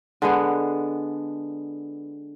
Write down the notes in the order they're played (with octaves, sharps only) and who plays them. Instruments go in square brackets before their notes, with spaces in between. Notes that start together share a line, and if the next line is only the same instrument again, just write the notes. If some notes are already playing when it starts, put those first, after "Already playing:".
[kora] D3 G#3 B3